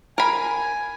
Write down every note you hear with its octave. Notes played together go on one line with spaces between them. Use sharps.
A#4 G#5 B5